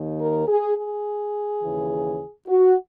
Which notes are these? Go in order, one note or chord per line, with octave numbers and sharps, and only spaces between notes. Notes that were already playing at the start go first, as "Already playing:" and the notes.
Already playing: D#2 D#3
A#4
G#4
G#4
D#2 C#3 E3
F#4